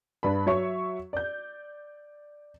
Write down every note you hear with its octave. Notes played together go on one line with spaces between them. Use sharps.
G2 D4 B4 B5
F#3 C#5 E5 C#6
D5 G6